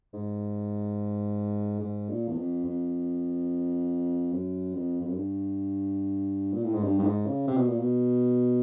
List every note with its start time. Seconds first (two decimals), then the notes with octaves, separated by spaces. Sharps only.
0.13 G#2
1.80 G#2
2.09 A#2
2.28 E2
2.37 F2
2.65 F2
4.33 F#2
4.75 F2
5.01 F2
5.08 F#2
5.16 G2
6.53 A#2
6.63 A2
6.73 G#2
6.84 G2
6.99 G2
7.05 G#2
7.26 C#3
7.47 C3
7.57 B2
7.68 A#2
7.79 B2